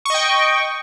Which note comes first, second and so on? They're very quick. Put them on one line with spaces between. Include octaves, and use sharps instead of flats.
C#6 D#5 G5